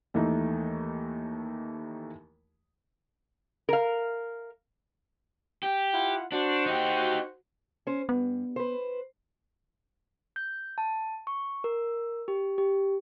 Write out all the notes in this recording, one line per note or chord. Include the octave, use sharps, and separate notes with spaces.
D#2 E3 A3 D#4
A#4 F5
G4
E4 F4 F#5
D4 F#4 C5
D#4 G4
C#4 C5
G2 B3
B4 C5
G6
A5
C#6
A#4
G4
G4